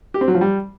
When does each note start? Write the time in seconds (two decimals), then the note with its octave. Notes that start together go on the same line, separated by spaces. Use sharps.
0.14 G4
0.21 C4
0.28 F#3
0.34 F3
0.41 G3